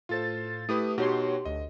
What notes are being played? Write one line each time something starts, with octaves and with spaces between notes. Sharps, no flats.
A2 F4 A4 C5 A6
A3 E4 G4 B4 D#6
B2 D#4 F#4 G4 C#5 C6
D2 D#5